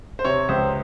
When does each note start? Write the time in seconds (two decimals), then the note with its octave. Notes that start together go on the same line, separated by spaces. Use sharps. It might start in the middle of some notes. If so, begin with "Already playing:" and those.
0.19 C5
0.25 C3 C#5
0.49 C#2 C5